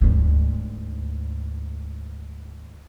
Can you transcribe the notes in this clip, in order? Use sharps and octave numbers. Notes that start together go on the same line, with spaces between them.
D2 G#2